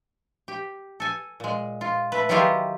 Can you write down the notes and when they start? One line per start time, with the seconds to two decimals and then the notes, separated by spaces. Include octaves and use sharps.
0.48 G4
1.00 A4 G#5
1.40 A#2 G#3
1.81 F4
2.12 A3 B4
2.29 D#3 F#3 E4 F4 G4 G#4